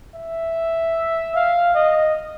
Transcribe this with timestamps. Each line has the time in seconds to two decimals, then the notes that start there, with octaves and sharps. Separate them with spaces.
0.14 E5
1.35 F5
1.74 D#5